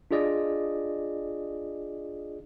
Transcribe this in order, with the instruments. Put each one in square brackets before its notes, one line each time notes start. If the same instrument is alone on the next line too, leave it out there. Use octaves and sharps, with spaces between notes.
[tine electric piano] D4 F4 G#4 D5 D#5